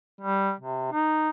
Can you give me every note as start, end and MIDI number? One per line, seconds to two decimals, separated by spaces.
0.21 0.52 55
0.60 0.90 48
0.92 1.30 63